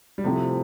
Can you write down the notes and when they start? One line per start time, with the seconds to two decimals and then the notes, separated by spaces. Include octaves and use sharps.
0.18 G3
0.24 A2 C3 F3 A3 C4 G4